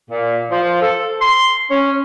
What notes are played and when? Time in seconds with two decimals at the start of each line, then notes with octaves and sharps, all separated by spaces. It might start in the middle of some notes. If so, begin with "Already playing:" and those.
0.10 A#2
0.51 F3
0.82 A4
1.21 C6
1.70 C#4